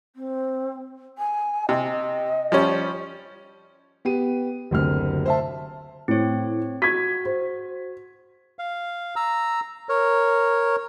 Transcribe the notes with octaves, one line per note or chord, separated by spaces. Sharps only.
C4
G#5
C3 D#5
F3 G3 C#4
B3 G4 D#7
F#1 D2 C3 F6
C5 E5 A5
A2 C4 C#5
F#4 G#6 B6
C5
F5
A#5 E6
A#4 C#5